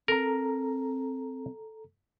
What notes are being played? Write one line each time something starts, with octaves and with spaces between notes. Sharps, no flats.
C4 A4 A#4 A#5